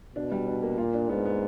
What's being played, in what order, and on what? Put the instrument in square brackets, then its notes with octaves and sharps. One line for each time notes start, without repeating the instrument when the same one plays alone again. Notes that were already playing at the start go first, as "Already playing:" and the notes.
[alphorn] B2 [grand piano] D4
[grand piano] G3
D4
A#3
[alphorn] A#2 [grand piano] F4
[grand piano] D4
[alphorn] G#2 [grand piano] B3
[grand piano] B3